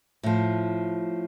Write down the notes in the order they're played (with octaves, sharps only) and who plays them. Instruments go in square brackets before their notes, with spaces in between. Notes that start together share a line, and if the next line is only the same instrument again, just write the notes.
[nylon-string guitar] A2 F3